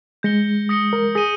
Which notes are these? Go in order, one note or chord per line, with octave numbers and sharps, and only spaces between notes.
G#3 G6 A#6 C#7 G7
D#6 A#6 C#7 G7
A#4
G#4 D#6 A#6 D#7 G7